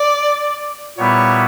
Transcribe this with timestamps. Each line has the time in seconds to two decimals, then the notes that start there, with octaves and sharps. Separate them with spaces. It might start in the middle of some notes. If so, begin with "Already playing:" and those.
Already playing: D5
0.98 A#2 G3 B3 E4 C#5